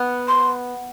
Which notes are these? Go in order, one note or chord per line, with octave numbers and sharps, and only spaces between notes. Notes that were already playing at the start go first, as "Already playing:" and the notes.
Already playing: B3
C6